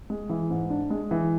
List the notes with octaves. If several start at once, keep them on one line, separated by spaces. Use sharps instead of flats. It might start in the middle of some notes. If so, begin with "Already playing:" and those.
G#3
E3
G#2
D4
G#3
E3